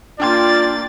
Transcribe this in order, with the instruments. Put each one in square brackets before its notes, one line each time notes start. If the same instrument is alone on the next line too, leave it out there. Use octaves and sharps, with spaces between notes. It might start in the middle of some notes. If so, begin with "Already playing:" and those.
[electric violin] A#3 A6 [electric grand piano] D4 G5 C6 [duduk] F4 [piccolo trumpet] D5